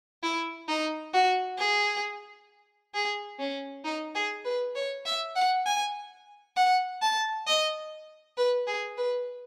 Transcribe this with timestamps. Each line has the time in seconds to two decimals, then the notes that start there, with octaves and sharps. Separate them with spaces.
0.23 E4
0.68 D#4
1.13 F#4
1.59 G#4
2.94 G#4
3.39 C#4
3.85 D#4
4.15 G#4
4.45 B4
4.76 C#5
5.06 E5
5.36 F#5
5.66 G#5
6.56 F#5
7.02 A5
7.47 D#5
8.37 B4
8.67 G#4
8.98 B4